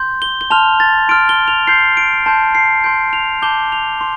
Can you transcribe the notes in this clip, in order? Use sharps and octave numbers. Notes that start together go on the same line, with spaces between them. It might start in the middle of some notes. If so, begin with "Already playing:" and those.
Already playing: C6 G6
G7
G7
A5 C6 F6 F7
A6
C6 F6 D7
G7
F7
C6 G6 C7
D7
A5 C6 G6
C7
C6 G6 D7
F7
A5 D6 G6 G7
F7
C6